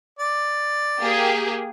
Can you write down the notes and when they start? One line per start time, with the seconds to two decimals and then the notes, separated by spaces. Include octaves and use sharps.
0.19 D5
1.00 A#3 G4 G#4